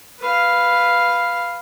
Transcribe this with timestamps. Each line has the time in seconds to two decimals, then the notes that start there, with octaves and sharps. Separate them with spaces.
0.19 B4 F5